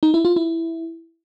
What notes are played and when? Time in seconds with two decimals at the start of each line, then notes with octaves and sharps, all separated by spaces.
0.03 D#4
0.14 E4
0.25 F4
0.36 E4